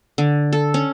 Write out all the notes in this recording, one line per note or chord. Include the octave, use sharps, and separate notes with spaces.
D3
A4
C#4